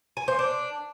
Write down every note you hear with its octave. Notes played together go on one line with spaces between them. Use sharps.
G#5
C5
D4